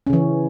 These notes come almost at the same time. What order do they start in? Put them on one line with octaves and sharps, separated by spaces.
C#4 C#3 E3